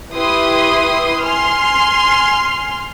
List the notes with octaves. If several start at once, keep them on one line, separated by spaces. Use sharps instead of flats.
E4 G4 B4 C6 D#6
G#5 C6 F6